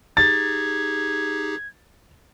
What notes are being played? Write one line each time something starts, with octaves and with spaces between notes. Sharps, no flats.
D#4 G4 G#4 G#6 A6